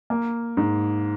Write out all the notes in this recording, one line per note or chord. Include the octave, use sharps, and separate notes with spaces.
A#3
G#2